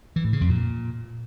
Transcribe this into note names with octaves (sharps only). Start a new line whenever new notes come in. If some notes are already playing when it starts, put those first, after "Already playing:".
E3
A2
C#3
F2
A#2